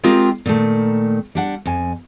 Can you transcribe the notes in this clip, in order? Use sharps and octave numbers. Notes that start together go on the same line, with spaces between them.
G#3 C4 F4 G4 G#4 A#4
A#2 D#3 A3
G3 D4 F#5
F2 G#5